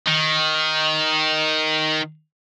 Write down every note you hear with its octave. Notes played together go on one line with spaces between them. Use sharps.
D#3